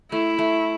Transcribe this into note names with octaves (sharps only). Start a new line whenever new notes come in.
A3 E4
A3